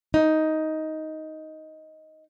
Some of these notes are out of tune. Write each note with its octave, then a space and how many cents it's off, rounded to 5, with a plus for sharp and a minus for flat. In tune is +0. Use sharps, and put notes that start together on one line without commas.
D#4 +10